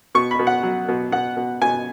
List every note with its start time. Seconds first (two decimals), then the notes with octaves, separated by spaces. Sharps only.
0.15 B2 C#6
0.31 B5
0.39 B2
0.47 F#5
0.63 F#3
0.88 B2
1.12 B2 F#5
1.37 B2
1.61 B2 G#5